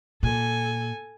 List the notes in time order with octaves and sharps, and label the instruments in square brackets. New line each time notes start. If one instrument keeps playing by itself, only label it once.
[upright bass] A#2 [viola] A4 G#5